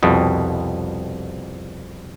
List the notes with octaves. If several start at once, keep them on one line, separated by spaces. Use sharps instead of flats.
C2 F2 B2